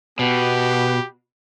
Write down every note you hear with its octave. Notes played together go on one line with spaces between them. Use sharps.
B2 B3 G4